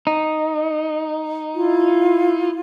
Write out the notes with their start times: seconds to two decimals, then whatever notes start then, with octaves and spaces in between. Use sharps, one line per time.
0.07 D#4
1.54 E4 F4